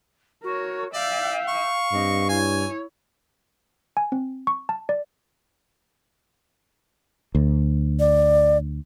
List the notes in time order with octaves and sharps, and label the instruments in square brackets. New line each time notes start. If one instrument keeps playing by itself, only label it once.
[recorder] F#4 [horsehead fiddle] A#4 C#5
[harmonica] D5 [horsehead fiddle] E5 G5 [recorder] F5
[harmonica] C#6
[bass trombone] G2 [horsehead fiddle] C4 D#5
[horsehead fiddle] E4 C#5 [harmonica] G#5
[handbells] G#5
C4
C#6
A5
D5
[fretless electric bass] D2
[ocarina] D5